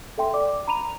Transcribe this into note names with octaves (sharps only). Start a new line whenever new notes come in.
A4 E5 G5 C6
D5 D6
A#5 B5 D#7 F7